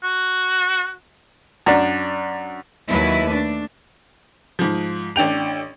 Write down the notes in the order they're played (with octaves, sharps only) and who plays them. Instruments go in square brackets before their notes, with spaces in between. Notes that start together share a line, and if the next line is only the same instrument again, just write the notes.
[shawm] F#4
[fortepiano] F#2 D4
[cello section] D#2 F#3 E4 B4
A3 D4
[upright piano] G#2 F3
A1 D4 G5 F7